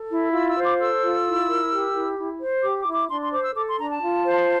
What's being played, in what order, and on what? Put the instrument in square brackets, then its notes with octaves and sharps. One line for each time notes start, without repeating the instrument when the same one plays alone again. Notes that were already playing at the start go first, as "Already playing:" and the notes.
Already playing: [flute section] A4
E4
F4 E6
E6
C5
D6
A4 E6
F4
E4
A#4
G4
E4
E4
C5
G4 D6
D6
E4
D6
D4 C6
C6
C5 D6
E6
A4 D6
C6
D4 A#5
A5
F4
C5